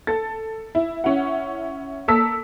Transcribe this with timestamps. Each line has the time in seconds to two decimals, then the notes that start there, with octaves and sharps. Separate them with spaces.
0.07 A4 A6
0.75 E4
1.04 C#4 E4 F#5
2.08 A#3 A4 A5 E6 B6